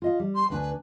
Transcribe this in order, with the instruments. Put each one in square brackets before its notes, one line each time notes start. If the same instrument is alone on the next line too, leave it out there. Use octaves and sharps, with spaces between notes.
[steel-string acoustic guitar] F4 D#5 F5
G3
[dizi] C6
[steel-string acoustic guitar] D2 D4 G#5 [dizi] B4